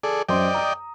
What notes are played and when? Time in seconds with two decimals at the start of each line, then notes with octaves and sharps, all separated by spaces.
0.03 G#4 A4 D5
0.29 F#2 C5 D5 D#5 G5 C6
0.54 A#5 D#6